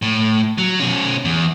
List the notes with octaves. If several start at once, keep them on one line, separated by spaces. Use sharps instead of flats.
A2
F#3
B2 C#4
E2